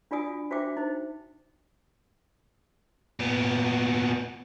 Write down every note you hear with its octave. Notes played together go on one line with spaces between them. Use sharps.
D4 F4 F#4 D5 G#5 D#6
D4 F#4 C5 E5 G5 D6
D#4 C5
A#2 B3